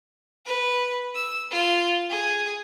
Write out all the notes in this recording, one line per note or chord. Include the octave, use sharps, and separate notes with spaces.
B4
E6
F4
G#4